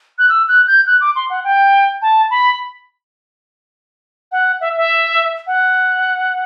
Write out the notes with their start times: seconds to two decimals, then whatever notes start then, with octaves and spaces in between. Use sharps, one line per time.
0.19 F#6
0.29 E6
0.48 F#6
0.68 G6
0.87 F#6
1.01 D6
1.16 C6
1.30 F#5
1.44 G5
2.02 A5
2.31 B5
4.32 F#5
4.61 E5
4.77 E5
5.47 F#5